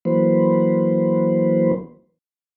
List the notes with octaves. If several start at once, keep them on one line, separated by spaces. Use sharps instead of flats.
E3 F#3 A#3 B4 C5